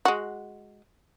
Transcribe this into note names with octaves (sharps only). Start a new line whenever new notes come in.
G#3 F#4